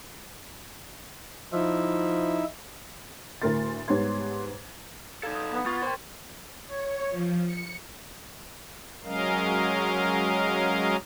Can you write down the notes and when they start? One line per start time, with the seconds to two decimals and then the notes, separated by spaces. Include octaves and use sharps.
1.53 F3 D#4 E4 E5
3.42 D2 A2 A#4 C6 A6
3.88 G#2 G3 B3 C#5 C6 G#6
5.23 D#4 A4 F5 A#5 G#6
5.35 D#6
5.52 B3
5.66 F4 C#6 G#6 A6
5.82 A#4 C5 G5 C6
6.67 C#5
7.09 F3
7.45 C#7
9.04 F#3 G#3 C#4 A#4 D#5 F5